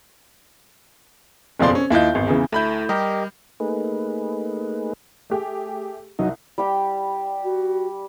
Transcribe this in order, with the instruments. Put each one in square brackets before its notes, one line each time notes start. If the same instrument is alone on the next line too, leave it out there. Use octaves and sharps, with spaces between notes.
[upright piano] F#1 F2 B2 F3 D5 C6
C4 C#4
D#2 E4 F4 D#5 G6
G#1 E2
E2 C#3 E3
[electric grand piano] D2 B5 G6 [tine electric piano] A3 E4
[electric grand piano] G3 [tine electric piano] G4 A#4 D#5
[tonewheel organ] A3 A#3 D#4 G#4 B4
[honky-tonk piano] A3 G4 G#4
[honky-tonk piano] C2 [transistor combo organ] F#3 D#4
[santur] G3 G4 G5
[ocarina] F#4